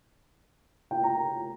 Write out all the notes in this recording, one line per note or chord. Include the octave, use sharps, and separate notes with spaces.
G5
A#5